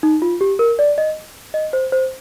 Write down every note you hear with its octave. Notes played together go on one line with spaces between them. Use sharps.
D#4
F4
G4
A#4
D5
D#5
D#5
C5
C5